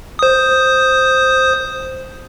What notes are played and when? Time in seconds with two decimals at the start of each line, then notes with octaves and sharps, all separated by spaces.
0.19 C5 D#6